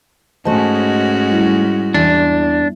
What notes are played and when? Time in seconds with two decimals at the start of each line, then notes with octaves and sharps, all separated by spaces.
0.45 G#2 A3 C#4 F#4 C5 D#5 G#5 A5
1.30 G3 E4
1.94 E2 D4